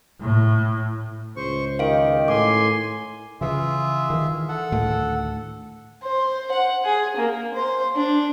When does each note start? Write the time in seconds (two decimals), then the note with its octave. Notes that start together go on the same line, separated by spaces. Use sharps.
0.21 A2
1.36 C#2 C5 C#6
1.79 D#3 G4 F5 D7
2.28 A2 G#5 C6 D6
3.41 C#3 E3 F4 G#4 E5
4.10 D#3 E3
4.49 A4 F#5
4.72 D2 A2 D#3
6.02 C5
6.51 F#5
6.85 G#4
7.17 A#3
7.54 C5
7.95 D4